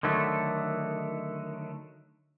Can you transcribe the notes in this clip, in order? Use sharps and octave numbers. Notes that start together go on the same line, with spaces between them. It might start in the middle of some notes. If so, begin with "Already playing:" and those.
D3 D#3 F#3 A3